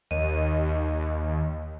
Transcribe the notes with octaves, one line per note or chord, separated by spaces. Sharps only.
D#2 D#5